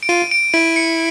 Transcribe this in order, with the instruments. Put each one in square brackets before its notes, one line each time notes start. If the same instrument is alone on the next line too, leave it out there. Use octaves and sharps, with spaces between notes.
[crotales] D7
[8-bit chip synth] F4 [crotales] D#7
[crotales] D7
[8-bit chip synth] E4 [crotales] D7
[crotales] C#7